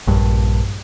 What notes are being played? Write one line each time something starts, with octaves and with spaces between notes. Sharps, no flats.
A#1 G2